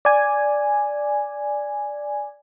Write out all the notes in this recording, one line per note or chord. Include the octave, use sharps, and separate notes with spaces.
D5 G#5